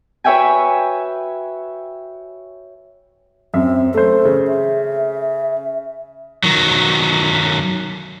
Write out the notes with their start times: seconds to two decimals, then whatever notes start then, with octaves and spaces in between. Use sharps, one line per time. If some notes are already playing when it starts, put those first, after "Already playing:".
0.24 F#4 B4 C#5 E5 G5 G#5
3.54 F#2 C4 E5
3.94 A3 A4 C5
4.25 C#3
4.48 E5
6.44 D#3 F#3